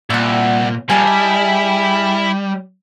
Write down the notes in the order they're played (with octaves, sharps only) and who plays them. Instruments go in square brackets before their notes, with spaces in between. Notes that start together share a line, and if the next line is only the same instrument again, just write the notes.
[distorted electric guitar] C2 [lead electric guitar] A#2 [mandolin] E5 F#5
[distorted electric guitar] F3 A#3 [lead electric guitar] G3 [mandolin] G#4 D#5 A5
[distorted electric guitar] E4 E5